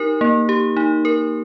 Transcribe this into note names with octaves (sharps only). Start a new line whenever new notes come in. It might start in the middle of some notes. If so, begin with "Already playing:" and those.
Already playing: D#4 G4 A#4
A#3
G4
D#4
A#4